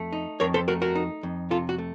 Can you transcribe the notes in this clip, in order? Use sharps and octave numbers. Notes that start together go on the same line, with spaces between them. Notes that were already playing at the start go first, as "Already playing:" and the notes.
Already playing: F2 A3
D#4
F2 A#4 C#5
A4 C5
A3 F#4 A#4
F#4 A#4
D#4
F2
C3 F4 A4
F#4
A3